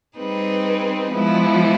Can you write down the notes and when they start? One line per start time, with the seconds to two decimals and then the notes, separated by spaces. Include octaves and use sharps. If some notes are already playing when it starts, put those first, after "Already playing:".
0.18 G3 C4 D#4 G#4 B4
1.12 F3 G#3 B3 E4